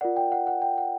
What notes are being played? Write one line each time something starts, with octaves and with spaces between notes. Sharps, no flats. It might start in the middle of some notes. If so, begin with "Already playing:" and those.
F4 A#4 D5 F#5
G5
F#5
F#5
G5
F#5